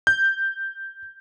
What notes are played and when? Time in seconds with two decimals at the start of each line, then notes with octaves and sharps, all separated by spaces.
0.07 G6